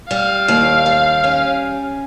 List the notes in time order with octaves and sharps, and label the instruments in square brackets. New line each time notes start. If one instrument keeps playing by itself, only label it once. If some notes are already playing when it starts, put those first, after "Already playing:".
[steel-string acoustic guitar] G3 [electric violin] F5
[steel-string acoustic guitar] D#2
G3
C#4